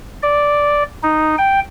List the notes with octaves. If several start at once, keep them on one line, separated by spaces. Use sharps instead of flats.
D5
D#4
G5